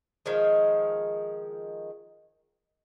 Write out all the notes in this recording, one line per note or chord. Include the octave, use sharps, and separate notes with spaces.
D#3 F3 G#3